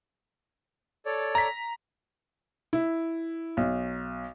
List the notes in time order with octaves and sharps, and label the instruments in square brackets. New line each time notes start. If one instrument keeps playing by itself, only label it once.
[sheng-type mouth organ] A4 C#5 D5
[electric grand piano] A#5 B6
[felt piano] E4
B1